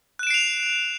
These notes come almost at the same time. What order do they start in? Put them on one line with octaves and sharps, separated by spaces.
F#6 E7 D7 C7 F7